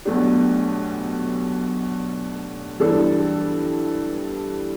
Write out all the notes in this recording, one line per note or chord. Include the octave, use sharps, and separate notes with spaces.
B1 B2 A3 D4 G4
G2 E3 G3 D4 A4